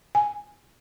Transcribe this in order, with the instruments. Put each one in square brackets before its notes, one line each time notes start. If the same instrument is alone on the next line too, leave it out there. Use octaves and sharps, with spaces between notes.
[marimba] G#5